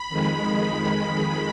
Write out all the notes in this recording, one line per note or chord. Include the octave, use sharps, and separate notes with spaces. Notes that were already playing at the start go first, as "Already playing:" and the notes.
Already playing: B5
F2 D#3 G#3